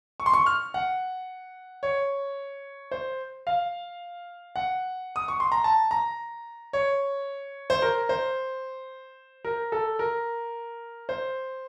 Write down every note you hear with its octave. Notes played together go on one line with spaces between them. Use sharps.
C#6
C6
C#6
F6
F#5
C#5
C5
F5
F#5
D#6
C#6
C6
A#5
A5
A#5
C#5
C5
A#4
C5
A#4
A4
A#4
C5